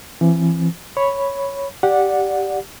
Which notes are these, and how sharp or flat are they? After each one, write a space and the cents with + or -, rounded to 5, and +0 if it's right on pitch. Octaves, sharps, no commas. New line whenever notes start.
E3 +30 C4 +25
C#5 +0 B5 +0
G4 -5 D5 +0 F#5 -15